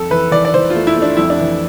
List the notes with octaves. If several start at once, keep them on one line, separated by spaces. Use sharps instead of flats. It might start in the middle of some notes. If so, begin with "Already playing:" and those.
Already playing: F2 A4
E3 B4
E3 D5
D5
E3 C5
F4
A3
E4
A3
D4
F2 E4
D4
E3